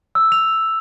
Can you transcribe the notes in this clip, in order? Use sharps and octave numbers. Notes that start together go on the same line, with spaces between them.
E6
F7